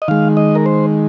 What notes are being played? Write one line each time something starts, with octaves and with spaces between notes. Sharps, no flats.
D#5
D#3 G#3 F5
D#5
A#4
C5